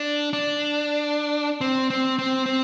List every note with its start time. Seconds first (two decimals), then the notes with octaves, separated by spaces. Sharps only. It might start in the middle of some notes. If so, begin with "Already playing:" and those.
Already playing: D4
0.33 D4
1.61 C4
1.90 C4
2.19 C4
2.46 C4